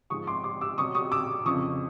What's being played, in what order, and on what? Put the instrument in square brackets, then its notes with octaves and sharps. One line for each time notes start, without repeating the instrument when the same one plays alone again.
[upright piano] G#2 F3 G#3 C#6 D#6
C6 D6
C6 D6
D6 E6
B2 F#3 C#6 D#6
C#6 D#6
D6 E6
F2 C#3 F3 C#6 D#6